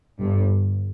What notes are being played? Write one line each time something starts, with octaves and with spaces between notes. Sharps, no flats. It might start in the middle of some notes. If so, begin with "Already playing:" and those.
G1 G2